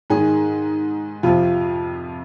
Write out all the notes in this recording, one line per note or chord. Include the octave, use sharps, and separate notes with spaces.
G#2 D#3 G#4
F2 C3 F3 F4